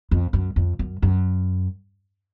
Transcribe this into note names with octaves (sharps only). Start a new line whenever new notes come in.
F2
F#2
F2
F#2
F#2